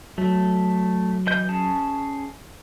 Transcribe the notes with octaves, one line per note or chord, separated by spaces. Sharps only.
F#3 A3
E3 D#5 G6
C#4 G#4 A5